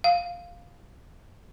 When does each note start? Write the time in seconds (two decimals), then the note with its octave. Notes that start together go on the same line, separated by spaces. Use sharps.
0.04 F5